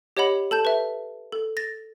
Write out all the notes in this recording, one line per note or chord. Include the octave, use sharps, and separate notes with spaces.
G4 C#5 D#5 F#5 B5
A4 A5 G6
B4 E5
A4
A6 A#6